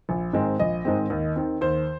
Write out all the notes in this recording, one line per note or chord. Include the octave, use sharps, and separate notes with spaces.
A#1
G#2 D#3 G#3 C4
A#1 D#5
G#2 D#3 G#3 C4
D#2
D#3 C4
D#2 C5